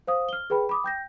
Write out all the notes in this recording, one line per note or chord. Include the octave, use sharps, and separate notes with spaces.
C5 F5 D#6
F6 G7
G#4 B4 G5 B5
B5 D6 D#6
G5 G6 A#6